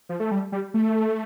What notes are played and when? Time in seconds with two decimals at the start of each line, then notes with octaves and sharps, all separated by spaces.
0.09 F3
0.20 A3
0.31 G3
0.52 G3
0.74 A3